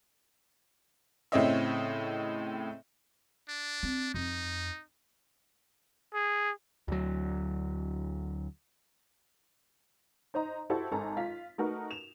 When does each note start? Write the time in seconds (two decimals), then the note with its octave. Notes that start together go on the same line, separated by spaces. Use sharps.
1.32 A2 C#3 C4 C#5 D#5 E5
3.48 D4
3.83 C4
4.14 F2 D#4
6.14 G#4
6.88 D2 F#3
10.34 D#4 C5 D#5 A#5
10.70 E4 F#4 G4 A4 C5
10.92 G#1 A4 A#4 G#5 A#5
11.17 F4 B6
11.58 A3 D#4 F#4 A#4 B4
11.91 E7 F7